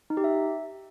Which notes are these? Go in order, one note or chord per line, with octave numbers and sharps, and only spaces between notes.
D#4
G4
E5